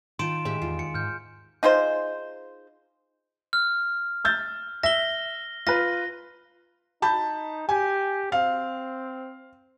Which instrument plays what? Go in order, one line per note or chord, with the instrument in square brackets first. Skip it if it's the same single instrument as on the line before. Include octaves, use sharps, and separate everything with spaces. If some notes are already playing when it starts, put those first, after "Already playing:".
[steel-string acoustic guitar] D#3 [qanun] F4 G5 A5 [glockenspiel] C6 D7 E7
[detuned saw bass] A2 [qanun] G#3 G4 E5
[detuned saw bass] E2 [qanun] F4
[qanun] G#3 [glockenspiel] C#7
[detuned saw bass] G#2 [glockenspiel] F6 G6
[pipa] D#4 F4 G#4 C5
[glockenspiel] F6
[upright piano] E6 G6 A6
[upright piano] E5 [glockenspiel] A#6 G7
[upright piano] F4 B4 [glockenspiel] A#6
[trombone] D#4 [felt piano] A5 B5 G6
[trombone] G4 [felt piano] G#5
[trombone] C4 [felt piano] F5